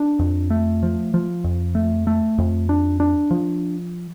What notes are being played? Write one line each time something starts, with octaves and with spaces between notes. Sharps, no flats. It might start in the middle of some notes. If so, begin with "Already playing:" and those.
Already playing: D4
F2
A3
F3
F3
F2
A3
A3
F2
D4
D4
F3